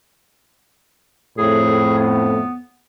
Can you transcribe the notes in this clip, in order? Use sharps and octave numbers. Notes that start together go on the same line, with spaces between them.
F2 A2 G#4
B3